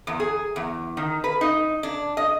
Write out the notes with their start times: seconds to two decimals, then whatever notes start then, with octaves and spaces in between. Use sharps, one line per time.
0.07 E2
0.20 G#4
0.56 E2
0.97 D#3
1.24 B4
1.41 D#4
1.83 D4
2.17 D#5